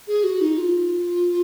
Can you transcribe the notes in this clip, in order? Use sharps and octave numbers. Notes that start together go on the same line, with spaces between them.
G#4
F#4
D#4
F4